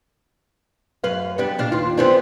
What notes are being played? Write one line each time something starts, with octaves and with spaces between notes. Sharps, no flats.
F#2 B4 F5
G3 B3 D4
A#2 D4 F5
D#2 F4
B3 C4 D4